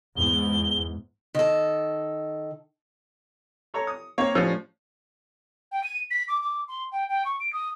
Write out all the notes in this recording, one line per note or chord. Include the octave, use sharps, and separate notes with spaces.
E2 G#2 G7
D#3 A4
A4 C#5 A#5
D#6
A#3 C4 C#5
A2 F3 G3 C#4
G5
D#7
B6
D6
D6
C6
G5
G5
C#6
D7
D#6